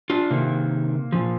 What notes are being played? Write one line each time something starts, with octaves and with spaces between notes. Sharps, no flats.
D4 F4
C3 D#3 A#3
A#2 F3